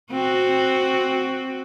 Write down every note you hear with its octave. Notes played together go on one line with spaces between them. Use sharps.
C4 F#4